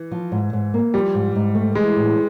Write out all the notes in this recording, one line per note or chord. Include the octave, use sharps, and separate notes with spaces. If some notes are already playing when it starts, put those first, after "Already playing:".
Already playing: E3
F3
G#2
G#2
A#3
F3 G3
G#2
G#2
A3
E3 G#3
A2